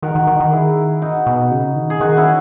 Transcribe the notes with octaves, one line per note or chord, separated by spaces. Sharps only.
D#3 F#4 A#4
D#3
D#3
D#3
E4 G#4
D#4 F#4
B2
C#3
D#3
G#4
D#3 D#4 F#4
C#4 E4